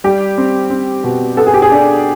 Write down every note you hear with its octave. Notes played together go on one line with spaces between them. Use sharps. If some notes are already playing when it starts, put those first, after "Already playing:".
G3 G4
C4
C4
B2
B3 A4
G#4
G4
G#4
D4